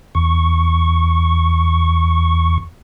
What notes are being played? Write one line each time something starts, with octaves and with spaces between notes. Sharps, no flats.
E2 C#6